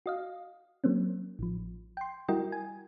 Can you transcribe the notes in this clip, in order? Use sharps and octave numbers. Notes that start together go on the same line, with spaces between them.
F#4 D#5 F5
F#3 A#3 C4 C#4
A1 F3
G5 C6
G3 E4 F#4 A#4 D#5 G5
G#5